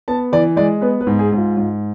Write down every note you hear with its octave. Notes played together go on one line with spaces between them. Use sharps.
B3 A5
E3 D5
G#3 D5
B3 B4
B4
G#2
G#4
G#2
F4
G#2